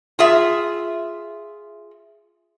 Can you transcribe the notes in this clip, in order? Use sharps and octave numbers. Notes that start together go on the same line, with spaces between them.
F4 G#4 E5